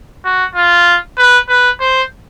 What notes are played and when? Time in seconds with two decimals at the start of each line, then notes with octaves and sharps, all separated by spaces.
0.24 F#4
0.55 F4
1.18 B4
1.49 B4
1.80 C5